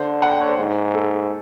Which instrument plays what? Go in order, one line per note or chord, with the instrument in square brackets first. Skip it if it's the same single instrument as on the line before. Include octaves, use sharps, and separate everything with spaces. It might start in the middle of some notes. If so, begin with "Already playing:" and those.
Already playing: [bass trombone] D3 [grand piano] C5
[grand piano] F#5
G5
C#5
C5
[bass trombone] G#2
[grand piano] A4